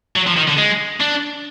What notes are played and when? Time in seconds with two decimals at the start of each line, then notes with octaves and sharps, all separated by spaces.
0.16 F#3
0.27 F3
0.36 D#3
0.48 D3
0.57 G#3
1.00 D4